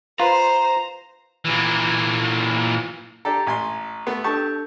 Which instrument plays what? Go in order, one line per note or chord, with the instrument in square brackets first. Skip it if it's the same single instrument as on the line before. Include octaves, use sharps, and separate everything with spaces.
[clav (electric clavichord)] F4 B4 [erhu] C5 [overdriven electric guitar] A#5
[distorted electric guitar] A#2 E3
[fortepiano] D4 G4 A4 [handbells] A#5
[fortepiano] A1 G#5 C6
A3 B3
[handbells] D4 A4 G6 [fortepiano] G4 A5 C#6